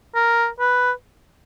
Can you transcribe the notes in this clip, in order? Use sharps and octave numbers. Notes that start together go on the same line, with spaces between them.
A#4
B4